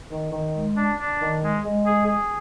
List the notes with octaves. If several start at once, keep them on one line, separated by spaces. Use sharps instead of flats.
D#3
D#3
G#3
D4
D4
D#3
G#3
G#3
G#4
G#4